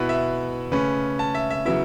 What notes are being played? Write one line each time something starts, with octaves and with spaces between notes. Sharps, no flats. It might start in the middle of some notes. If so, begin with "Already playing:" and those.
Already playing: B2 B3 E4 B4
E5
C#3 A3 C#4 B4
A5
E5
E5
C#3 F#3 B3 E4 E5